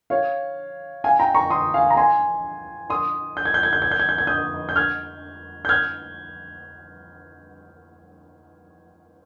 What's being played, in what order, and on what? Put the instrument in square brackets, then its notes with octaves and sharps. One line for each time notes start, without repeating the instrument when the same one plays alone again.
[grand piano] C#5 F5
F5 G#5
G5 A#5
A#5 C#6
C6 D#6
F5 G#5
A#5
G#5 C6
C6 D#6
G6
G#6
G6
G#6
G6
G#6
G6
G#6
G6
G#6
D#6 G6
G6
F6 G#6
G6
F6 G#6